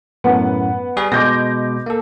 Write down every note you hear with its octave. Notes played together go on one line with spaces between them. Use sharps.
F#2 A2 B3
G3 G#4
B2 G#3 D6 G6 A#6
A#3 A4